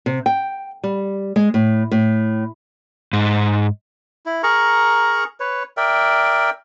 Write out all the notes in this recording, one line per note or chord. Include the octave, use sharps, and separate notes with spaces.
C3
G5
G3
G#3
A2
A2
G#2
E4
G#4 A#4 A#5 C#6
B4 C#5
A#4 D5 E5 G5